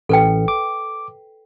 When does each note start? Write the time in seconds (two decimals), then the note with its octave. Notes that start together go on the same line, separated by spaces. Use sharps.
0.09 A1 A4 B4 G5
0.48 D6